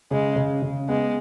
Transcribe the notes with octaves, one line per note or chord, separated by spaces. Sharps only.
C#3 G#3
C#3
C#3
G#3 B3